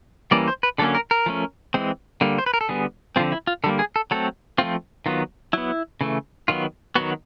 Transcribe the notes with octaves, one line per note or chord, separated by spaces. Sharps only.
E3 G3 A#3 C#4 D5
C5
B4
D3 F#3 A#3 C#4 A4
A#4
A#4
F3 A3 C#4
E3 G#3 C4
D3 G3 A#3
C5
B4
A#4
A4
D3 G3 B3 G#4
D3 F3 G#3 C4 F4
E4
F4
D3 G3 A#3 A4
G#4
A4
F#3 A3 C4 A4
F3 A3 C4 F4
D#3 F#3 B3 F4
F#3 B3 E4
C#3 E3 A3
D#3 F#3 B3 F4
D#3 F#3 B3 F#4